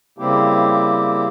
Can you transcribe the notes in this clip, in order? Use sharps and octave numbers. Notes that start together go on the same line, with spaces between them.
C#3 G3 A#3 C4 E4 G4